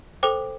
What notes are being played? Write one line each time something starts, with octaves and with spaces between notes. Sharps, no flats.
A4 C5 G5 D6